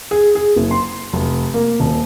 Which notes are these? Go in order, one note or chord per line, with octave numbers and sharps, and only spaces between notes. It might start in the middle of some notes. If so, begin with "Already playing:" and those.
G#4
G#4
F#1
C6
F1
A#3
D#1